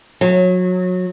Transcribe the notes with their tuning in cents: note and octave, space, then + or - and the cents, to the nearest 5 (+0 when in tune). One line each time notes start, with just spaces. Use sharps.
F#3 -25